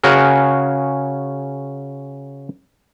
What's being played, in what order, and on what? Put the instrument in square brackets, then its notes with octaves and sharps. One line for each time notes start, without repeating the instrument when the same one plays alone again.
[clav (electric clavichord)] C#3 F#4 G#4 A#4